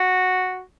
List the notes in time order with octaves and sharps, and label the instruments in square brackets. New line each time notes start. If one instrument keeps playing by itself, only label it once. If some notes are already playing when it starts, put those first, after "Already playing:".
Already playing: [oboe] F#4